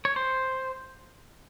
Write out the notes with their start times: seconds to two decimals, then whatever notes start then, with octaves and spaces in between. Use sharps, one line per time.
0.05 C#5
0.16 C5